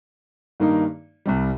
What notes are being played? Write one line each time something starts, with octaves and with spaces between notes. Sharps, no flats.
G2 D#3 A#3 D#4
C2 C3 G3